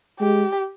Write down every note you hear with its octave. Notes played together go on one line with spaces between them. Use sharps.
G#3 G4